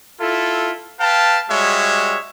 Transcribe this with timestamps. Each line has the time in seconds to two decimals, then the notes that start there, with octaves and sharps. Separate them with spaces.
0.20 E4 F4 A4
0.99 B4 F5 G5 A5
1.50 G3 G#3 F#4 C#5 E5